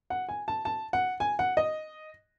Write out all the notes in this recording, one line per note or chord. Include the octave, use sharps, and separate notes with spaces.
F#5
G#5
A5
A5
F#5
G#5
F#5
D#5